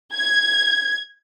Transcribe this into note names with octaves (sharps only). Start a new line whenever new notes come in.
G#6